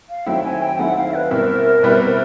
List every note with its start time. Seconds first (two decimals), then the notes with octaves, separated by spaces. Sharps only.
0.10 F5
0.26 D#3 F#3 A3 C4 E4 G5
0.44 G#5
0.62 G5
0.79 D#3 F#3 A3 C4 E4 F#5
0.97 F5
1.14 B4
1.30 B2 G3 C4 E4 A#4
1.83 B2 G3 C4 E4 B4
2.01 A#4